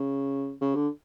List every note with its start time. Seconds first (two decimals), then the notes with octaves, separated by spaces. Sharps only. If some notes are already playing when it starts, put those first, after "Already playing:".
Already playing: C#3
0.61 C#3
0.75 D3